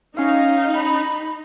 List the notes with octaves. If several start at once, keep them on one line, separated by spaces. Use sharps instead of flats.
C#4 D#4 F5
B5